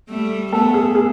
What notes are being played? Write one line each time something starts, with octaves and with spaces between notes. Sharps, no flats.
G3 A3
A3 B3 A4
G#4
G#4